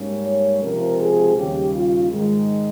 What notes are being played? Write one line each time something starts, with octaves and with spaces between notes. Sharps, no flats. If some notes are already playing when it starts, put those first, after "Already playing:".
Already playing: G#2 G3 A#3 C#4
C#5
C#2 C3 F3 A#4
G#4
D#2 C#3 G3 G4
F4
G#2 D#3 G#3